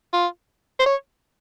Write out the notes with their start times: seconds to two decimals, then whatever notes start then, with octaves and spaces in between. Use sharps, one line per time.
0.13 F4
0.80 C5
0.86 C#5